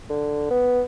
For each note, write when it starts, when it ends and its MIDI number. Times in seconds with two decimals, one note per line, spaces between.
0.10 0.50 50
0.50 0.82 59